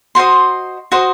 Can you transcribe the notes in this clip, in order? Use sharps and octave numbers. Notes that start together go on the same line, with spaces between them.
F#4 C5 D#5 C6
F#4 C5 D#5